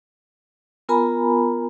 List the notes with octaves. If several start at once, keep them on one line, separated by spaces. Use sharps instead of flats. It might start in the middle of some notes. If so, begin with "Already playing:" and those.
B3 F4 A#4 G#5 A#5 B5